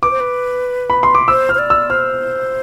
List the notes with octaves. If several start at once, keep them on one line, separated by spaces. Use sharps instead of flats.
B4 D6
C5
B4
B5
C6
D6
C5 E6
F6
C5
D5
E6
C5 F6